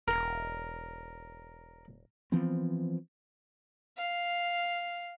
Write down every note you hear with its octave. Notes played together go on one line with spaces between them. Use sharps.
E1 A#4
E3 F3 B3 C4
F5